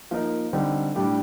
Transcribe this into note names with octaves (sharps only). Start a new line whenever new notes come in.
F3 A#3 D#4 A#4
D3 G3 C4 D#4
A2 G3 D4 G4